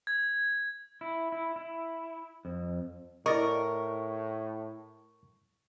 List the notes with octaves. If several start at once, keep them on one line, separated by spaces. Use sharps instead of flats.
G#6
E4
E4
E4
F2
A2 E4 A#4 D5 D#5 C#6